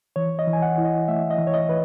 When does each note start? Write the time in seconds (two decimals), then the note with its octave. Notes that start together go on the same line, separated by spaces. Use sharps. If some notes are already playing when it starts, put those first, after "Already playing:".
0.16 E3 C#5
0.39 D#5
0.47 E3
0.53 G#5
0.62 F#5
0.78 E4
0.85 D#5
1.08 A3 E5
1.31 D#5
1.38 E3
1.47 C#5
1.54 D#5
1.69 E3 B4